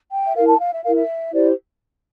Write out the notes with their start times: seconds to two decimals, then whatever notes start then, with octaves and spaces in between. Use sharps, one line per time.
0.12 G5
0.25 E5
0.35 E4 A#4 F5
0.48 A5
0.60 F5
0.72 E5
0.83 E4 A#4 F5
0.94 E5
1.33 E4 G4 C5 D5